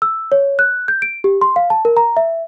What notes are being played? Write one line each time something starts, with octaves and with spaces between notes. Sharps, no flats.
E6
C#5
F#6
G6
D7
G4
C6
F5
A5
A#4
A#5
E5